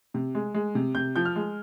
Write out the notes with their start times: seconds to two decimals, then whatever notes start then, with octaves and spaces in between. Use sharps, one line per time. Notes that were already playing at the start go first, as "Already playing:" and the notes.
0.14 C3
0.35 G#3
0.54 G#3
0.75 C3
0.95 C3 G6
1.16 F3 G6
1.25 F6
1.36 G#3